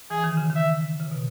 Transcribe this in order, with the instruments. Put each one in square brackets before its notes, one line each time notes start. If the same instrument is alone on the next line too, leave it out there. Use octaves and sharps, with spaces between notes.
[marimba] E3 [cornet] G#4
[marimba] D#3
C#3
D#3
[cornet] E5
[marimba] C#3
B2